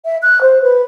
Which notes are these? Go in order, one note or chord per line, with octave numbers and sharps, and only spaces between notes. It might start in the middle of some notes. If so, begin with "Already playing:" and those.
E5
F#6
C5
B4